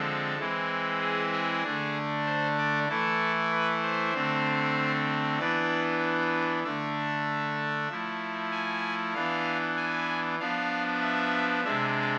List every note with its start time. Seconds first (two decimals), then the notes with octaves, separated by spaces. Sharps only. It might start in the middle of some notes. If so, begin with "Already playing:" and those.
Already playing: D3 F3 G#3 C4 A4
0.38 E3 G#3 C4 E4
1.00 G#4
1.32 G#4
1.63 D3 A3 D4
2.26 C5
2.57 D5
2.88 E3 A3 E4 A4
3.51 B4
3.83 C5
4.14 D3 A3 C4
5.38 E3 B3 D4 D5
6.63 D3 A3 D4 E5
7.89 F3 A3 E4
8.51 G#5
9.14 E3 B3 D4 F5
9.77 G#5
10.39 F3 B3 D4 F5
11.01 E5
11.64 C3 G#3 D4 E5